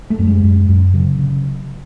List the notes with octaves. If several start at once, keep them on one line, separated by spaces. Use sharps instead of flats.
A3
F#2
G#3
F#2
F#2
C#3 F#3
C#3